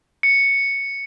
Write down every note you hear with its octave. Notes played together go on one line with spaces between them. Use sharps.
C#7